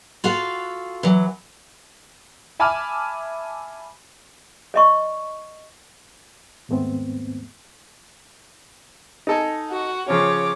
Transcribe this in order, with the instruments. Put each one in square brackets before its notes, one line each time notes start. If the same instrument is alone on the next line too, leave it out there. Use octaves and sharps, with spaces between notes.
[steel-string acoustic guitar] F4 F#4 A4 F5
E3 F#3
[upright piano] E5 G#5 A5 B5 D6 F6
[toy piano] D5 D#5 C#6
[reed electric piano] D#2 G#2 A3 B3 C4
[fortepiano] D#4 A4 G#5
[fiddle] F#4
[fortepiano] C#3 F3 C#4 [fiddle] C#5 D6